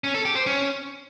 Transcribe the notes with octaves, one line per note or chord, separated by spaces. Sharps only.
C#4
A4
G4
C5
C#4